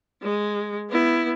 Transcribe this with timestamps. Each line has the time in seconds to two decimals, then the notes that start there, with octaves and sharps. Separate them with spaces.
0.22 G#3
0.90 B3 E4